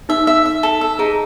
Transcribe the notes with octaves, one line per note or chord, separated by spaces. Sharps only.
D#4 E5
E5
E5
A4
E5
D#4 G#4